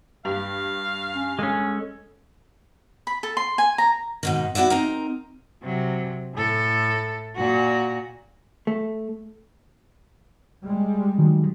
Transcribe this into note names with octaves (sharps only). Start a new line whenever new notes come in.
G2 G4 F5 F7
C#4
G#3 C#4 A4
B5
A4
C6
G#5
A#5
G#2 B2 D#3
B3 E4 F#4 D5 E5
C4 D#4 A#4
C3 F#3
A2 A4
A#2 F#4
A3
G3 G#3
D#3 F#3